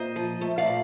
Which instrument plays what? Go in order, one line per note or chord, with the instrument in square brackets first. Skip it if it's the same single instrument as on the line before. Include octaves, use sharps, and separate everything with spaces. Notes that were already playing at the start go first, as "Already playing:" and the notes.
Already playing: [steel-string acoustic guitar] A#2 C5 D#5
F3
A3
D5 F5
A#2